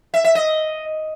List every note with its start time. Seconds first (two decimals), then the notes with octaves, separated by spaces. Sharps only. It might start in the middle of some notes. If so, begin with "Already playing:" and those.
0.14 E5
0.24 E5
0.35 D#5